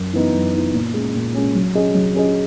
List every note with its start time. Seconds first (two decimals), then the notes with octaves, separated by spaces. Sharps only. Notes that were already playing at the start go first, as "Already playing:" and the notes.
Already playing: F#2
0.13 E3 B3 D#4
0.34 F#2
0.53 E3 B3 D#4
0.74 A#2
0.94 G#3 C#4
1.14 A#2
1.35 G#3 C#4
1.55 F#3
1.75 C#4 G#4 D#5
1.95 F#3
2.15 C#4 G#4 D#5